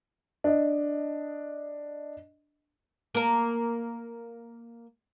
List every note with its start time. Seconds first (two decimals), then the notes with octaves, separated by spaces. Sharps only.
0.44 D4 D#5
3.15 A#3 A#4